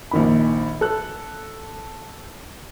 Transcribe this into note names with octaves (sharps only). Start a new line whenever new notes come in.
A#1 D#3 B5
A4 F#6